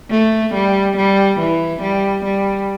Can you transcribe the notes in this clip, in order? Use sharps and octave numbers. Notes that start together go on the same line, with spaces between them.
A3
G3
G3
E3
G3
G3